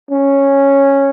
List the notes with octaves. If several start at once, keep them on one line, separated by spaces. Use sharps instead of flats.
C#4